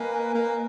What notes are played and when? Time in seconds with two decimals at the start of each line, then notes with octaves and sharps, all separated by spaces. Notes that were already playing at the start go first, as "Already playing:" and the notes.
Already playing: A#3 B4 D#5 G#5
0.34 A#3